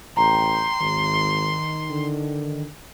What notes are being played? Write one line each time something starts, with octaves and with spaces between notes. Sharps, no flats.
A1 G5 A#5 C6
G#1 D#3
D3